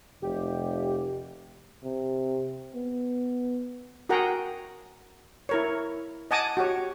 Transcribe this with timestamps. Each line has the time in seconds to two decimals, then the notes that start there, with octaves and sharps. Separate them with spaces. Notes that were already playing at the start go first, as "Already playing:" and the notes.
0.22 F1 G4
1.84 C3
2.75 B3
4.09 F#4 G#4 A#4 F#5 G5 A#5
5.49 E4 A#4 C#5
6.31 D#5 F#5 G#5 A5 D6 D#6
6.57 F#4 G4 C#5